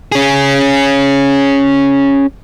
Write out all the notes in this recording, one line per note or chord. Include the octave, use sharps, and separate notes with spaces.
C#4 G#4